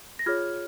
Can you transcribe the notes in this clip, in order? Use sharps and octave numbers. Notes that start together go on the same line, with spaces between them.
A#6
F4 G#4 C#5 F6 G#6